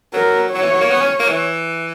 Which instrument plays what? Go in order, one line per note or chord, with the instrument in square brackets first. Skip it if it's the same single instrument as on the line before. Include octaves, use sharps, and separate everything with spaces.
[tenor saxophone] F#3 [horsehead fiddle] A#4
[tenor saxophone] F#3 [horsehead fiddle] C#5
[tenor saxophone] E3
F#3
A#3
B3
C#4
A#3
E3